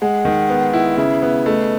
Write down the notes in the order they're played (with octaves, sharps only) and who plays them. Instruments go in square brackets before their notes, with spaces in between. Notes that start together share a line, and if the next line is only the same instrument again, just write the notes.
[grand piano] G#3 [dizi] F#5
[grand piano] D#3
B3
E4
[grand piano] C#3 [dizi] E5
[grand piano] B3
[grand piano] A3 [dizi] D#5